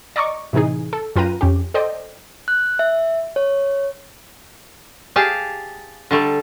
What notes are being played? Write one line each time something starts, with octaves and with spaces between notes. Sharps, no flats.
D5 D#5 A#5 C#6 D6
A2 C3 E3 D#4 G#4
A4
F#2 F4 B4 G5 A#5 D#7
F2 C#4 G4
A4 C5 D5 D#5 G5
F#6
E5
C#5
G4 G#4 F5 A5
D3 G3 A3